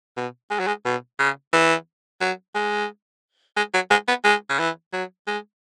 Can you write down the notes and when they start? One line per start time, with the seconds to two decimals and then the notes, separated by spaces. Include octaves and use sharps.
0.17 B2
0.51 G#3
0.60 F#3
0.67 G#3
0.85 B2
1.19 C#3
1.53 E3
2.21 F#3
2.55 G#3
3.57 G#3
3.74 F#3
3.91 G#3
4.08 B3
4.24 G#3
4.50 C#3
4.59 E3
4.93 F#3
5.27 G#3